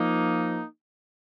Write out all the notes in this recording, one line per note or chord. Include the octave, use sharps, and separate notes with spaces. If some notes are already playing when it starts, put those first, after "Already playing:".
Already playing: F3 A#3 D#4